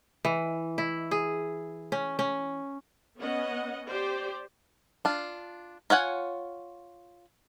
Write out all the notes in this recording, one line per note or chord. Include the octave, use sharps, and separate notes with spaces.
E3
E4
G#4
C#4
C#4
B3 C#4 D#5 F#5
G4 C5 D5
D4 F4
F4 C#5 F#5 G#5